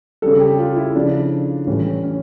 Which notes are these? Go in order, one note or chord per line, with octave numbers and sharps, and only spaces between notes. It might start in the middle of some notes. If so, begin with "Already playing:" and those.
C#3 G3 A4
G4
F4
E4
C#3 F3 D4
A2 E3 G3 C#4
C#4